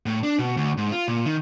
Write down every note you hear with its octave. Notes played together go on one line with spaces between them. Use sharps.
A2
D4
B2
D2
G#2
F4
A#2
D#3